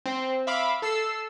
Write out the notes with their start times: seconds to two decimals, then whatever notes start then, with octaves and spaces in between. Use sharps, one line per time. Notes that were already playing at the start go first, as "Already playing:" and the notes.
0.06 C4
0.47 E5 F5 B5 D6
0.82 A4 E6 C7